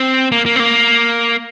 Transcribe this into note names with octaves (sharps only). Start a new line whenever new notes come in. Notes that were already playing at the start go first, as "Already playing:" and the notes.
Already playing: C4
A#3
A#3
C4
A#3